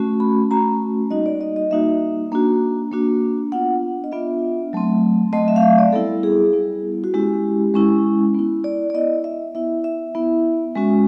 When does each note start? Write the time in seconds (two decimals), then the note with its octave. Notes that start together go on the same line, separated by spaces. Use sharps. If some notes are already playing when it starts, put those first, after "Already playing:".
Already playing: A3 C#4 F#4
0.20 B5
0.51 A3 C#4 F#4 A#5
1.10 G3 A#3 D#4 F#4 D#5
1.26 D5
1.41 D#5
1.56 D#5
1.71 G3 A#3 D#4 F#4 E5
2.32 A#3 D4 F#4
2.92 A#3 D4 F#4
3.52 B3 D4 F4 F#5
4.04 D#5
4.12 B3 D4 F4 E5
4.73 F#3 A3 C4
5.33 F#3 A3 C4 D#5
5.48 E5
5.56 F5
5.62 E5
5.78 D5
5.93 G3 B3 E4 A4
6.23 G#4
6.53 G3 B3 E4
7.04 F#4
7.14 G#3 C#4 E4 G4
7.74 G#3 C#4 E4
8.34 B3 E4
8.64 D5
8.90 D5
8.94 B3 E4 D#5
9.24 E5
9.55 B3 E4 E5
9.84 E5
10.15 B3 E4
10.75 G#3 C#4 F#4